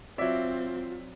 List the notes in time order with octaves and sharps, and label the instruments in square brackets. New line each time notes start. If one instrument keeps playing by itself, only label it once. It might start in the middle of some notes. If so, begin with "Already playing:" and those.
[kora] F#3 D5 [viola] C4 [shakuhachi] F4 [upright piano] E5